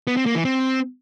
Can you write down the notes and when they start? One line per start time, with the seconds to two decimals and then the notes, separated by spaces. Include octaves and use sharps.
0.07 B3
0.17 C4
0.26 A#3
0.35 E3
0.45 C4